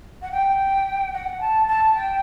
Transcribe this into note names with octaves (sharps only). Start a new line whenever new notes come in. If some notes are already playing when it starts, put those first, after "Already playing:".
F#5
G5
F#5
A5
A5
G5